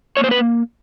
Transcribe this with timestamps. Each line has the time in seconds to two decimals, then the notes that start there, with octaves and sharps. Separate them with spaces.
0.17 A#3 C#5
0.24 C5
0.31 B4